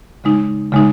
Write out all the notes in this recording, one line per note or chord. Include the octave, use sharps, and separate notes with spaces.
C#3 G#3 D#4
C#3 G#3 D#4